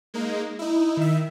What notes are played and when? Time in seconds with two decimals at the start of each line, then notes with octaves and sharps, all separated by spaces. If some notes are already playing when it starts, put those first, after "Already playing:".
0.14 G#3 A#3 D#4
0.59 D#4 E4
0.97 D#3 E5